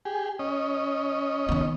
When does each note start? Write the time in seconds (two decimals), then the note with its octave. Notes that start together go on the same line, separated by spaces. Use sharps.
0.05 G4 G#4
0.39 C#4 D#5
1.49 D#3 B3